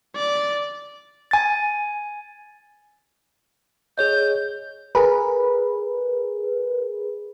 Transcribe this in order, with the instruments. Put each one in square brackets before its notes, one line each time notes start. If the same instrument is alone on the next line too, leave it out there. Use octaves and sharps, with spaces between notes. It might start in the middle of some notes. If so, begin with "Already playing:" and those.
[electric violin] D5
[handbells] G#5 A6
[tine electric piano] G#4 C#5 D#5 [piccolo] G6
[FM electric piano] G#4 A#4 B4